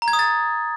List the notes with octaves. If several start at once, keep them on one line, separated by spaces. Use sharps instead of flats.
A#5
G#6
D#6
A6